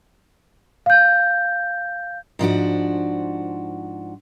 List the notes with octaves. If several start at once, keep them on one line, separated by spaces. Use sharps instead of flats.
F5 G6
G#2 F3 D4 F#4